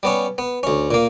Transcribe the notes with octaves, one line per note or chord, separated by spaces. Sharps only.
G3 B3 C#4
B3
D2 C#4
A#2 A#3